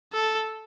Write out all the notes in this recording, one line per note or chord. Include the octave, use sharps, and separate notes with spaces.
A4